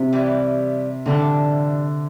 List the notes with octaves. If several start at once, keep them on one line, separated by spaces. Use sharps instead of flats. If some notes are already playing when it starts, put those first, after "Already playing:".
Already playing: C3
E3 G3 E4
A2 D3 E3 G3 D4 A4